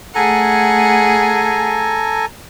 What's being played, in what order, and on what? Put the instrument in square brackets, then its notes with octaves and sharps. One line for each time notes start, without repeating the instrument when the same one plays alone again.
[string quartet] A3 G#4 F#5 [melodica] A4 G#5 A#5